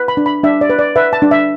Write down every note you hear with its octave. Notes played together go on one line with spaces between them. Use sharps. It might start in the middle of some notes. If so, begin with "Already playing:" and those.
Already playing: B4
B5
D4
B5
D4 E5
D5
B4
D5
B4 E5
A5
D4
E5